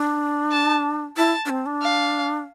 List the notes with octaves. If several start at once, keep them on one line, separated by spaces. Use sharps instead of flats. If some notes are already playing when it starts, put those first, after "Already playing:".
Already playing: D4
A5
E4 A5
D4
C4
D4
F5